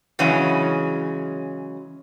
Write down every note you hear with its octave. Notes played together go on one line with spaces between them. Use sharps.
C#3 E3 F#3 G#3 C#4